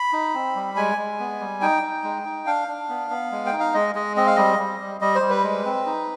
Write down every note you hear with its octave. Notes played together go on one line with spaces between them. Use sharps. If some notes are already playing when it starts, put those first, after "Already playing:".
Already playing: B5
D#4
C4
G3
G#3 G#5
G#3
B3
G3
D#4 G5
D#4
G#3
D#4
D4 F5
D4
B3
B3
G#3
G5
D#4
F5
G#3 D#5
G#3 D#5
C4 D#5
F5
G3 D#5
G3
G3
G3 D#5
C5
G3
B4
G#3
C4
D#4